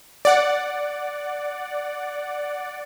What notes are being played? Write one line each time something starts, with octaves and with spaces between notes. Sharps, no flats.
D5 F#5